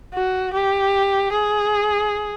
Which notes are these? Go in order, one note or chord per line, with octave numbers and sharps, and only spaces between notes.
F#4
G4
G#4